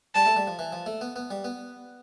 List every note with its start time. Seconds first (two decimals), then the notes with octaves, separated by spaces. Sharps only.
0.15 G3 A5
0.26 A3
0.36 G3
0.47 F3
0.59 E3
0.73 F3
0.86 A3
1.01 B3
1.16 B3
1.31 G3
1.44 B3